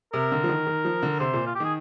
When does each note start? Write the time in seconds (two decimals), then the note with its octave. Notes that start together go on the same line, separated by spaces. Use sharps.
0.13 C3 A#4
0.32 D3
0.44 F3
0.49 D#3
0.67 D#3
0.85 F3
1.02 D3
1.20 C3 C5
1.33 A#2
1.46 F4
1.55 G4
1.60 D#3 G#4